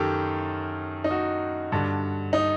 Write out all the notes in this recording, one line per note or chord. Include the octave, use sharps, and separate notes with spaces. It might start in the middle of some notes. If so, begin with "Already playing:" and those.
Already playing: F#2 D#3 G4 A4
D#4
F#4
G2 D3
D#4